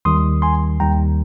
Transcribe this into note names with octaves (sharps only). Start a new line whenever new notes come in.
D#2 D#3 G3 C6 D#6
G#5 C6
D#2 D#3 G3 G5 A#5